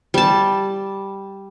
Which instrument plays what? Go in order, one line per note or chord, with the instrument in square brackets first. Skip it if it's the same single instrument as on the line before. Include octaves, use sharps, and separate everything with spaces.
[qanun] G3 A5